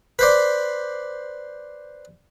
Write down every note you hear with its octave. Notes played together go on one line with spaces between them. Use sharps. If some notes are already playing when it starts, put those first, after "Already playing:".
B4 C5 D5